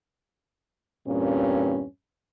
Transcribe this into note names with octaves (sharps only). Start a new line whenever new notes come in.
E2 G2 A#2 C4 C#4